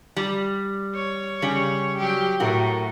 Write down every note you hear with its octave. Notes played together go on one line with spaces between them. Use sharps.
G3
C#5
C#3 G3
F#3 G4
A2 F#4 A#4